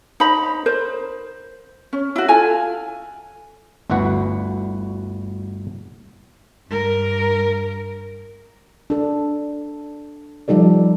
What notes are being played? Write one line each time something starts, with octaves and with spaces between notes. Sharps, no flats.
D#4 C5 A#5 B5
A#4 C5
C#4
E4 F#4
F4 A4 G#5
G1 D2 E4 F#4 B4 F#5
G2 A#4
D4 A4
F3 G3 D#4 A4 D5